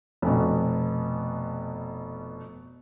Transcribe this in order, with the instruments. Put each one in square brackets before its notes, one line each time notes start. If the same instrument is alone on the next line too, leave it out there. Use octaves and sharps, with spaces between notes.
[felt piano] F1 B2